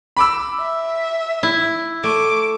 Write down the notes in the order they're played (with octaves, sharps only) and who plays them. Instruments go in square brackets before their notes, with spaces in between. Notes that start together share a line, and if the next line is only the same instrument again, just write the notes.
[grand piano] B5 D6 E6
[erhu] E5
[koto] E4
[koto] A3 [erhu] D6